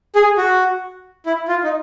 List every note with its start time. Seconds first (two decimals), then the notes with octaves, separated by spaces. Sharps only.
0.15 G#4
0.37 F#4
1.26 E4
1.48 F4
1.64 D#4